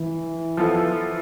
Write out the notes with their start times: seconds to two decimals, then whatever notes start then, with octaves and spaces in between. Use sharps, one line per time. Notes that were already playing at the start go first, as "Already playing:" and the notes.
Already playing: E3
0.57 F3 B3 F4 A4